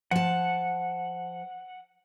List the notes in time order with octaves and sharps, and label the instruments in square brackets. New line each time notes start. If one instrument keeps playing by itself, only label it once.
[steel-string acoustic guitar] F3 A5 [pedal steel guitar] F#5